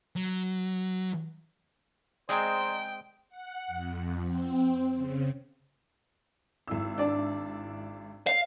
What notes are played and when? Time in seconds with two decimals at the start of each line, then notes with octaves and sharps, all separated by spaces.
0.16 F#3
2.29 G#3 C4 G#4 C5 D5 D#5 G5 A#5
3.29 F#5
3.67 F2
4.20 C4
4.94 C#3
6.68 G#1 E4 E6
6.98 D4 D5
8.27 F5